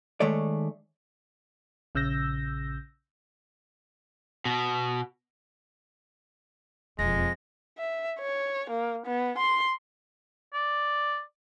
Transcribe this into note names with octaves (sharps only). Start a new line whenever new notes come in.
D#3 G#3 A3 C#5 D5
A#1 C#3 E6 G6 A#6
B2
E1 F2 F3 G#3 A#6
E5
C#5
A#3
B3
C6
D5